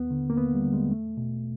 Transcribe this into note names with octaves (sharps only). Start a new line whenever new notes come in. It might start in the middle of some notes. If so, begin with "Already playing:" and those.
Already playing: D#2 B3
D3
A#3
D#2 B3
G3
D3
G#3
E2 A3
B2